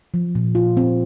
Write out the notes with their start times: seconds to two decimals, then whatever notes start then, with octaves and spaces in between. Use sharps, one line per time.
0.14 F3
0.35 A#2
0.55 F4
0.77 C4